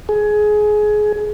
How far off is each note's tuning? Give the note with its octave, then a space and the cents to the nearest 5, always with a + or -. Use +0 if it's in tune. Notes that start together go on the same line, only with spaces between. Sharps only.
G#4 +20